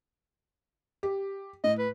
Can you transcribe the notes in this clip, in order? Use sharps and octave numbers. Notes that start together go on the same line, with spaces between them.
G4
A2 D#5
B4